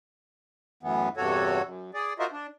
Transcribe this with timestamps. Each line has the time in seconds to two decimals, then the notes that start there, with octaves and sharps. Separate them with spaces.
0.83 F#2 A2 E3 B3
1.17 E2 G2 C3 F#4 A4 C#5
1.65 F#2
1.94 G#4 D5
2.19 F4 F#4 A#4 C5 D#5 E5
2.32 D4